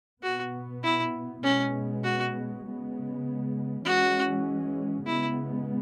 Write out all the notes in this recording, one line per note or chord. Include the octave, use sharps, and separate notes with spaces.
B2 B3 F#4
E4
B2 G#3 B3 C#4
F#4
C#3 G#3 B3
E3 G#3 C#4 F#4
C#3 G#3 B3 E4